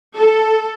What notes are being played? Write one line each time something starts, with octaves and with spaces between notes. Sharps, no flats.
A4